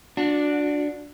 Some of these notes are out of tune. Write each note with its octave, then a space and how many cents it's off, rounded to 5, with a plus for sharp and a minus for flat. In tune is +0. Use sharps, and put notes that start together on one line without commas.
D4 +0 F#4 -30